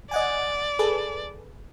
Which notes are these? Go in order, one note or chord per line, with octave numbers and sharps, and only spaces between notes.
D5 D#5 F#5 G#5
G#4 A4 B4